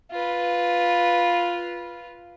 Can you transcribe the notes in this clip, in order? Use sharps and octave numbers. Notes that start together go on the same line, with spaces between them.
F4 B4